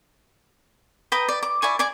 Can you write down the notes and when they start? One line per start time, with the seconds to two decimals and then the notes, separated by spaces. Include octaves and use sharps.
1.12 B4 G5 A#5 D#6
1.29 D5
1.43 D6
1.62 E4 D5 G#5 C#6
1.79 D5 G#5 D6